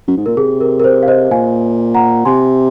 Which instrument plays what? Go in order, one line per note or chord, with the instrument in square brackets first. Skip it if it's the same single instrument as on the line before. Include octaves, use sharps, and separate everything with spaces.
[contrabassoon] F#2
G#2
[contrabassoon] A#2 [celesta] A#4
[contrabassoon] C3 [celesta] G#4
[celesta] A#4
A#4
C5
F5
C5 D#5
[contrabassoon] A#2 [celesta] F5 G#5
[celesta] F#5 A#5
[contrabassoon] C3 [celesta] G#5 C6